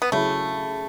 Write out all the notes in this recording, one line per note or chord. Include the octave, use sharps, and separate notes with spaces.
B3
C#3 F#3 A3 C#4 E4